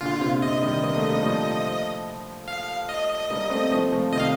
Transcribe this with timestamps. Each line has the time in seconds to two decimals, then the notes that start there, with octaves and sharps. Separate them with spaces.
0.01 A#2 D3 F4
0.21 C3
0.42 C3 D#5
0.62 D#3 G3
0.83 A#3
0.96 A3
1.10 G3
1.22 F3 A3
2.48 F5
2.89 D#5
3.30 G3 A#3
3.50 A3 C4
3.71 F3 A3
3.92 F3 A3
4.12 C3 D#3 D#5
4.20 F5